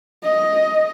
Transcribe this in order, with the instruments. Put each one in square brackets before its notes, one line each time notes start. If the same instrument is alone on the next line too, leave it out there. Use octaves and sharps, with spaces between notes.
[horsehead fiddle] D#5